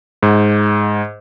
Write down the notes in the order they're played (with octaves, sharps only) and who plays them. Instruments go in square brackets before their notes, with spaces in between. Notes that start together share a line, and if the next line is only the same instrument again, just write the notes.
[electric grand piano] G#2